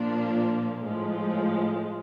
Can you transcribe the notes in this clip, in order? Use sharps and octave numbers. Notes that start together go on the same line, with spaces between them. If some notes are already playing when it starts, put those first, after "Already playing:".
Already playing: A#2 F3 A#3 D4
A2 F3 G#3